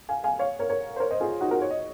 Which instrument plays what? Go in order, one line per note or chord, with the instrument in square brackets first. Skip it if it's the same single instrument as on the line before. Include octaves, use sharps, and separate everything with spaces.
[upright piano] F5 G#5
F5 G#5
C#5 F5
A#4 C#5
A#4 C#5
C5
A#4 C#5
C5 D#5
F4 G#4
D#4 F#4
F#4 A#4
C#5
D#5